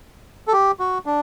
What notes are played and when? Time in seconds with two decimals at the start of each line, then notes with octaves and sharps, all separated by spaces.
0.48 A4
0.53 G4
0.80 F#4
1.06 D4